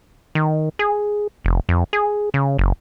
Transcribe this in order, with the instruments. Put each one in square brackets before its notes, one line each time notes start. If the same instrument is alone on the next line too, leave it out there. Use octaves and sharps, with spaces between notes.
[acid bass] D#3
G#4
F1
F2
G#4
C#3
F#1